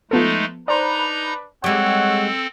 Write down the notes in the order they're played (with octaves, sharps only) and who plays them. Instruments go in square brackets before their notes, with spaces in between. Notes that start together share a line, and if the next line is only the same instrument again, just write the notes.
[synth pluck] F3 B3 A4 [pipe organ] G#3 A3 D#4
[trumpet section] D4 B4 [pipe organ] D#4 A#5 [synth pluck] C5 D5
[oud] G3 G#3 [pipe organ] C4 A4 [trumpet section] C#5 F#5 [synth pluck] D6